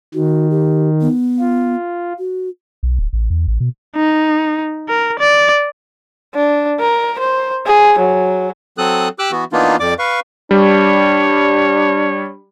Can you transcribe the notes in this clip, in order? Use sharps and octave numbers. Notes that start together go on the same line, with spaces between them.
D#3 F#4
G4
B3
F4
F#4
B1
D1
A1
E2
A1
B2
D#4
A#4
D5
D4
A#4
C5
G#4
F#3
F#3 C4 A4 D#6 F#6
G4 D6 E6 F#6
E3 B3 F#4
E3 A#3 B3 D4 D#4 F4
F2 D5 D6
B4 F5 C#6
G3 D4 C#5